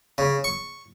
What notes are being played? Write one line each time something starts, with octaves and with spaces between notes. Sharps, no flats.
C#3
C#6